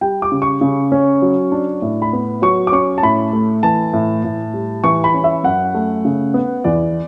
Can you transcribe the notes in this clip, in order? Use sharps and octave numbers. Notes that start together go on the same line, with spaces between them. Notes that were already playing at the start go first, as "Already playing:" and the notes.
G3 G5
D6
C#3
C#6
C#3
C#4
F#3
D4
A2
B5
B3
F#3 C#6
D6
C#4 C#6
A5
A2 B5
A3
E3 A5
A2
A2
G3
E3 C#6
B5
C#4
E5
F#2 F#5
A3
C#3
B3
E2 D5